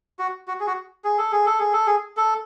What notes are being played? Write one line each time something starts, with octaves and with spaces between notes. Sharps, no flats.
F#4
F#4
G#4
F#4
G#4
A4
G#4
A4
G#4
A4
G#4
A4